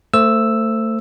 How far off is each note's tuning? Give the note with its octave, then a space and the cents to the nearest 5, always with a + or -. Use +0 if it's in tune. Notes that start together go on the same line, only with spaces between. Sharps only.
A3 +25 C5 +0 E6 +0